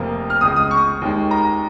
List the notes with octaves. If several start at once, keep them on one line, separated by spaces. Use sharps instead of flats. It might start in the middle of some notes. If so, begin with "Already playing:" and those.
Already playing: F1 F2 F3 A#3
F6
C#2 C#3 G#3 D#6
D#6
C#6
D#2 D#3 G#3
A#5